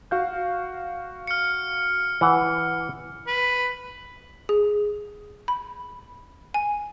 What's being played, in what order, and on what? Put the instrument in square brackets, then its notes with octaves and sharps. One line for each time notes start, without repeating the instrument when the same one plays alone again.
[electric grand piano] F#4 F5 G6
[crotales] F6 C#7
[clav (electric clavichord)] E3 F#5
[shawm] B4
[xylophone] G#4
B5
G#5